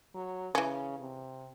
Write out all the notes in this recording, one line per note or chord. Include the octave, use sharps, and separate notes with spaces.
F#3
C#3 E3 C#4
C3